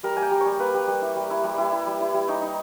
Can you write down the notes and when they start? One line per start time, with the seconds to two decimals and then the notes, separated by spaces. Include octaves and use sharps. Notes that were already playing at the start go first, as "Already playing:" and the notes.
0.03 G3 A#4
0.16 A#3 G#5
0.22 G5
0.31 G3
0.40 C#5
0.46 G3
0.59 A#3 B4
0.74 G3
0.87 G3
1.02 E4
1.16 G3
1.30 E4
1.44 G3
1.58 E4
1.72 E4
1.87 G3
2.01 E4
2.14 G3
2.28 D#4 C#5
2.42 D#4